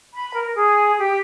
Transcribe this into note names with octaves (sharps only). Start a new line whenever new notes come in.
B5
A#4
G#4
G4